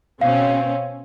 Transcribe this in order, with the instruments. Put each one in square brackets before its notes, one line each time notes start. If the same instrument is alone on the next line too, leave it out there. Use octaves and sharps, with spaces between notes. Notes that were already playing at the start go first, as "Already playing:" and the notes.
[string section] B2 C4 C#4 [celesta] F5